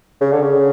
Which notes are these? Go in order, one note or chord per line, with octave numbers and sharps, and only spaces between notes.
C#3
D3
C#3